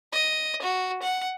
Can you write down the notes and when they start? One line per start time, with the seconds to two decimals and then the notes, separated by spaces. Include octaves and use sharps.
0.12 D#5
0.61 F#4
1.02 F#5